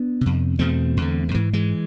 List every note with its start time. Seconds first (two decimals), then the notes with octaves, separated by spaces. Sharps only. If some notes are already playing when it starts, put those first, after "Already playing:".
Already playing: B3 D4
0.21 F2 C3
0.59 E2 B2 A3 C4
0.97 E2 D3
1.29 D3
1.34 G#2 E3
1.53 E3 G#3